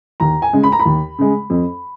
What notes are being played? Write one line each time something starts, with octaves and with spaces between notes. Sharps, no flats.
D#2 A#5
G#5
C#3 G#3
B5
A#5
B5
D#2
C#3 G#3
F2